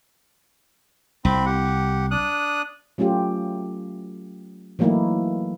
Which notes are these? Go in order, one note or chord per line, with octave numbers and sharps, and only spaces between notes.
C2 C4 B5
G4 F#5
D4 D#6 F#6
F#3 A3 C#4 F4 G4
E3 F#3 A3 A#3 D#4 E4